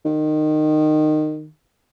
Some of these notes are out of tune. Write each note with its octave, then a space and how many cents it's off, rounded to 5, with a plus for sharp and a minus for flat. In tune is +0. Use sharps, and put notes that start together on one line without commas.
D#3 -20